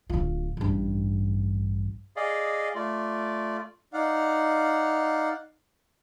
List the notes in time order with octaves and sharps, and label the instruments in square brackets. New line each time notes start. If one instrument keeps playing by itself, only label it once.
[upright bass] D1 F4
A1 G2
[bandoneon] G#4 D5 D#5 F5
A3 F4 D5
[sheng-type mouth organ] D#4 D5 F5 F#5